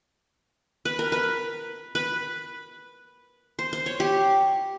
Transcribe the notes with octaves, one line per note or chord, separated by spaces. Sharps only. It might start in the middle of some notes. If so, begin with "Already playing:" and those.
B4
A#4
B4
B4
C5
C5
C#5
G4